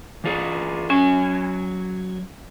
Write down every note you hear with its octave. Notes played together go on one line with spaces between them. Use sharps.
E3 F4 G#4
F#3 C#4 G#5